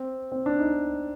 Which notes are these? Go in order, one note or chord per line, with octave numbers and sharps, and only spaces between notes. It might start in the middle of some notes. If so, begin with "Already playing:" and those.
Already playing: C4
C4
D4
D#4